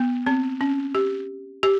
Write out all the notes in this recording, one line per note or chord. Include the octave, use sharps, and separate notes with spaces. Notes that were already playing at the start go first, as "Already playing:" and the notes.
Already playing: B3
C4
C#4
G4
G4